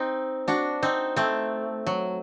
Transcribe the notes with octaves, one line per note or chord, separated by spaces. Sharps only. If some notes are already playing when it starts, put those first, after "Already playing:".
Already playing: C4 D#4
D4 F#4
C4 D#4
A3 C4
F#3